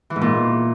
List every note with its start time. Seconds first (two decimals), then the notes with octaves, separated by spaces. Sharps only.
0.10 E3
0.16 G#2
0.21 A#2